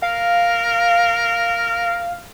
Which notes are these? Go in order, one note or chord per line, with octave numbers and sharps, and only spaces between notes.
A#4 F5